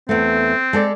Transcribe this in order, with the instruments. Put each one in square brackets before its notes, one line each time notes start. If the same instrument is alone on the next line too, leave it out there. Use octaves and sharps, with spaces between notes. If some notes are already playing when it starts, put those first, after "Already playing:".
[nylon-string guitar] E2 A3 [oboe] C4
[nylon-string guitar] G#3 A4 D5